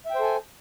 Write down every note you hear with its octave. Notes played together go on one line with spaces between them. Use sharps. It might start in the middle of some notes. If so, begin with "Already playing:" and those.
A4 C5 E5 G5 G#5